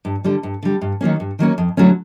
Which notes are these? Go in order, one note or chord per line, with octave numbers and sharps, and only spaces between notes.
G2
D3 G3
G2
D3 G3
G2
D#3 F#3 A#3 C#4
G2
D#3 F#3 A#3 C#4
F2
D3 F#3 A3 C#4